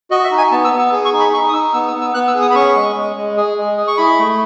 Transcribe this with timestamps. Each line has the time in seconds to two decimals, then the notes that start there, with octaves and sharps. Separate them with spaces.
0.11 F#4 D#5
0.24 E5
0.31 D#4
0.38 G#5
0.51 B3 A5
0.65 E6
0.72 B3
0.79 E6
0.92 G#4
1.05 C#6
1.12 D#4
1.20 B5
1.33 D#4 C#6
1.49 D#6
1.53 D#4 E6
1.74 B3 E6
1.88 E6
1.94 B3
2.01 E6
2.14 B3 F#6
2.27 E6
2.34 G#4
2.42 D#6
2.50 B5
2.55 C#4 C#6
2.76 G#3
2.96 G#3
3.16 G#3
3.37 G#4
3.58 G#3
3.77 G#4
3.88 C#6
3.97 E4 B5
4.19 A3